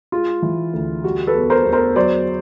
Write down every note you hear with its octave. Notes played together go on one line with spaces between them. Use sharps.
G#3 F4
E3
D2
G3 F#4
A4 B4
E2
A#4 C5
E2
A#4 C5
F#3 C5 D5